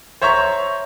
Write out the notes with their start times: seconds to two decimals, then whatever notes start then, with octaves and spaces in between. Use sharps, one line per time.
0.22 C5 C#5 E5 A#5 C#6